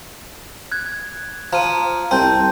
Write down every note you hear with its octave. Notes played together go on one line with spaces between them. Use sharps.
F#6 G#6
F3 A#5 D#7
C2 C4 A5 G6